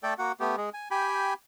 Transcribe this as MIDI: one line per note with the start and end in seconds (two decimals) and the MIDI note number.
0.03 0.14 57
0.03 0.14 69
0.03 0.14 74
0.03 0.14 79
0.19 0.32 58
0.19 0.32 66
0.19 0.32 78
0.40 0.56 57
0.40 0.56 59
0.40 0.56 67
0.57 0.70 56
0.57 0.70 68
0.74 0.89 80
0.91 1.34 67
0.91 1.34 79
0.91 1.34 80
0.91 1.34 83